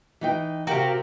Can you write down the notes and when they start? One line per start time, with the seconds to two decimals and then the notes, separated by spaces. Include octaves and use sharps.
0.21 E3 D#4 G5
0.67 C3 F#4 G4 A#4 F5 G5